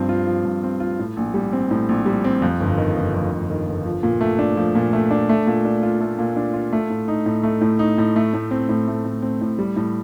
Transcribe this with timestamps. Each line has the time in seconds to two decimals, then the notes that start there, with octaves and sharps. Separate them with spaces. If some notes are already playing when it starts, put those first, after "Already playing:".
Already playing: G2 F3 C4
0.09 F4
0.27 F3
0.45 G2
0.63 C4
0.80 F4
0.99 A2
1.17 A#1
1.34 G3
1.53 C4
1.71 A2
1.89 A#1
2.06 G3
2.24 C4
2.42 F2
2.61 G1
2.78 D#3
2.96 G1
3.14 F2
3.32 G1
3.50 D#3
3.68 G1
3.86 F3
4.03 A#2
4.21 A3
4.39 D4
4.57 F3
4.75 A#2
4.93 A3
5.11 D4
5.29 A3
5.47 A#2
5.65 D4
5.83 F4
6.00 A3
6.19 A#2
6.36 D4
6.54 F4
6.73 A3
6.90 A2
7.08 D#4
7.26 A2
7.43 A3
7.61 A2
7.79 D#4
7.98 A2
8.16 A3
8.34 A2
8.51 C4
8.69 A2
8.88 A3
9.05 A2
9.22 C4
9.41 A2
9.58 G3
9.76 A2